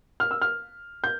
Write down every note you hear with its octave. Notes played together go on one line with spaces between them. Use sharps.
F6
E6
F6
G6